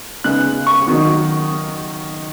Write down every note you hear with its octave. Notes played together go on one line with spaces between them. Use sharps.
C#3 G#3 B3 D#4 F#6
C#6
D#3 F#3 D#4